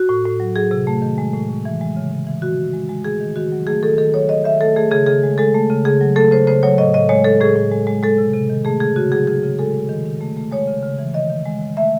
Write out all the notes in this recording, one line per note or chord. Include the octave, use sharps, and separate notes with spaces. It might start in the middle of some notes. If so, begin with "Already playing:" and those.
Already playing: F#4
A2
A2
F#3
F#3 G#4
C3
A3
D#3
G#3
A2
A2
E3
G#3
C#3
C#3
E3
D#3 F#4
D#3
G#3
G#3
A3 G#4
D#3
D#3 F#4
F#3
A3 G#4
D#3 A4
D#3 A4
F#3 C#5
D#3 D#5
D#3 E5
A3 A4
A3 G#4
C#3 G#4
C#3 G#4
G#3
G#3 A4
A3
C#3
C#3 G#4
F#3
A3 A4
C#3 C5
C#3 C5
F#3 C#5
A2 D#5
A2 D#5
G#3 C#5
G#3 A4
A2 G#4
A2
G#3
G#3
G#3 A4
C3
C3
D#3
A3 G#4
C#3 G#4
C#3 F#4
F#3 G#4
C#3 G#4
C#3
G#3 A4
G#3
D#3
D#3
A3
A3
G#3 C#5
C#3
C#3
E3
D#3 D#5
D#3
G#3
G#3
A3 E5